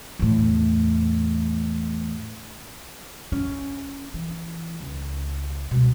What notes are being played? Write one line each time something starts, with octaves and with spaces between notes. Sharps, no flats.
E2 A2
C#4
E3
C#2
B2 G#3